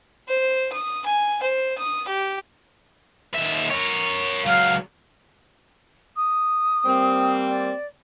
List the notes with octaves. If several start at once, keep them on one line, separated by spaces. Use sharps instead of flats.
C5
D#6
G#5
C5
D#6
G4
D#2 E5
A#4 C#5
C#2 F#3 F5
D#6
G3 A#3 C4
D5